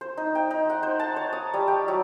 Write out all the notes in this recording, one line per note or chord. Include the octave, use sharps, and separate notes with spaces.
C5
D#4
G5
D#4
F#5
C5
A5
C#5
D#6
G3
G5
F#3